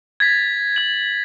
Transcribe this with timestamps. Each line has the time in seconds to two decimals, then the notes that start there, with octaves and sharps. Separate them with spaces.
0.20 G#6 A6 B6
0.76 G#6 F#7